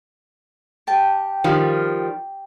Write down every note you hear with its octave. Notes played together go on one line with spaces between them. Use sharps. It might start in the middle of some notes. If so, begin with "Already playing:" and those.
G4 G5 A5
D#3 F3 G3